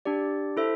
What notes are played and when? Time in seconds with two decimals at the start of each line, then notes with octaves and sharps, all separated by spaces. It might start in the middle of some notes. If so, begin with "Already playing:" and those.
0.05 D4 G4 D5
0.57 E4 A4 C5 E5